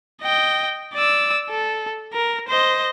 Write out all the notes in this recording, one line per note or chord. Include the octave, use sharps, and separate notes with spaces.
D#5 G5
D5 E6
A4
A#4
C5 D#5